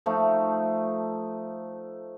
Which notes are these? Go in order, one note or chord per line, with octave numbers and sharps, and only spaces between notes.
F3 A3 D#4